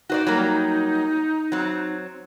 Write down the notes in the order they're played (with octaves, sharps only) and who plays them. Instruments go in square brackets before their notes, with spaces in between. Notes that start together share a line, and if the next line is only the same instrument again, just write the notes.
[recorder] D#4 [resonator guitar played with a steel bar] F#4 C5 D5
[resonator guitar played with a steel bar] F#3 G3 A#3
F#3 C4